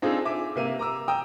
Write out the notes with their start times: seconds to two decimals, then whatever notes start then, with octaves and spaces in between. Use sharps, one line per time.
0.02 C4 D4 D#4 F4 G#4 A4
0.25 E5 G#5 D6
0.56 C3 A#3 D#7
0.79 A#5 D6 E6
1.08 G5 A#5 D#6 E6